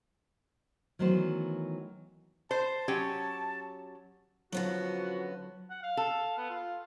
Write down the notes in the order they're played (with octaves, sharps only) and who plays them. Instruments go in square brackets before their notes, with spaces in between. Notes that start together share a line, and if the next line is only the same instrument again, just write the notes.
[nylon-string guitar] D#3 E3 F#3 A3 B3 C5
[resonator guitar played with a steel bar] C5 [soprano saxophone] A5
[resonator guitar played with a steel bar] F#3 C#4 G4
[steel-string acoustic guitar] D3 B3 C#4 [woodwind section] F3 F#4 [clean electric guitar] F#3
[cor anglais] F#5
F5
[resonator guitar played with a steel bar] A4
[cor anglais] B3
F4